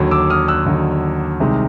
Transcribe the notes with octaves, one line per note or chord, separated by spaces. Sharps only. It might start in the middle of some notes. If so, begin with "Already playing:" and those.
Already playing: D#2 D3 F#3
D6 E6
D#6 F6
E6 F#6
D#2 D3 F#3
C2 C3 D#3 G#3